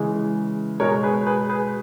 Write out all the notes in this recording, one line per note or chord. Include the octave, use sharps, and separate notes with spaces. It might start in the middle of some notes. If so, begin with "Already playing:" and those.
Already playing: C#3 E3 G#3
B2 G#3 A#4 C#5
G#4 B4
G#4 B4
G#4 B4